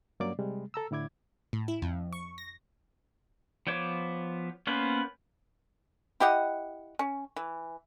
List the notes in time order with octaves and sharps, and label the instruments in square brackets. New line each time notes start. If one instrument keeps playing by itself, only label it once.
[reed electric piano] G2 F#3 A#3 C#4 D5 D6
C3 G3 G#3
A4 A#5 E6
A2 D3 E4 D6 G#6
[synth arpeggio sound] A2
E4
F2
C#6
A#6
[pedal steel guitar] F3 B3 C5 C#5 D6
A#3 B3 C#4 B4 C5
[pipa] E4 G4 D#5 F#5
C#4
E3